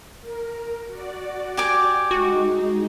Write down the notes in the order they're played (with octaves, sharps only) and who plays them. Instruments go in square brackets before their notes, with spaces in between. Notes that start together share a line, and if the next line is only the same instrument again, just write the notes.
[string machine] A#4
F#4 D5
[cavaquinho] G4 G#5 D6
[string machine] G#3 D#4 [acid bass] F#4